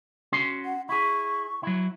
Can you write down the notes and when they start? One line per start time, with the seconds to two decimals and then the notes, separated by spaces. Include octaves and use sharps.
0.32 C#4 F#4 C6
0.65 F#5
0.89 E4 G#4 C#6
1.63 F#3 E4